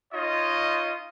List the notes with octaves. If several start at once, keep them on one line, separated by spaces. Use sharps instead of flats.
D#4 F4 C#5 D#5